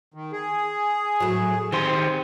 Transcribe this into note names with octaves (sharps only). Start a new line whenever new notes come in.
D#3
G#4
A2 F#3
D#3 C4 G4 C6